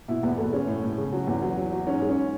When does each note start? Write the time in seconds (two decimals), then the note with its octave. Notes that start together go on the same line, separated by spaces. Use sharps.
0.08 B2 E4
0.23 E2 B3
0.38 B2 A3
0.52 G#3 C#4
0.68 A2
0.83 A2
0.98 C#3
1.12 F#3
1.27 E2
1.42 F#3
1.57 F#3
1.72 F#3
1.87 G#2 C#4
2.02 G#3
2.09 C#4